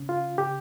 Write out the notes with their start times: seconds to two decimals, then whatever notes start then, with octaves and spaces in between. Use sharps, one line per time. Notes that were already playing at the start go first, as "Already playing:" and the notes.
Already playing: C#3 C#4
0.09 F4
0.38 C#3 G4